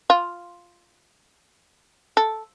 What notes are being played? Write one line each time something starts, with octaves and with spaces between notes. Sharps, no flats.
F4
A4